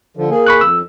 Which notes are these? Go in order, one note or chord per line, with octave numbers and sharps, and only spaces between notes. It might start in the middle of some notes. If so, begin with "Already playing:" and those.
D3 F3
A#3 G#4
B5 C#6 F#6
F2 E6